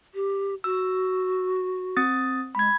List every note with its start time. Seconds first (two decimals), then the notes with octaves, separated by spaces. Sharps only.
0.14 G4
0.64 F#4 E6
1.97 C4 D#6 A6
2.55 G#3 B5 G#6